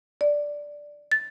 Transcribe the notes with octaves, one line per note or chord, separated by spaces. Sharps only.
D5
A6